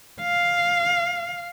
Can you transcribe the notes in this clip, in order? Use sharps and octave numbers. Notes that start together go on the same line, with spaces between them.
F5